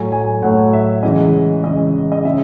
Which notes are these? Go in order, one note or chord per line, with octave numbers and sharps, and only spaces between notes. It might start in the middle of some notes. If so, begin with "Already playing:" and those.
Already playing: A2 F#3 A3 G#5
G#5
A2 F#3 A3 F#5
E5
C#3 E3 G#3 D#5
C#3 E3 G#3 D#5
D#5
C#3 G#3 E5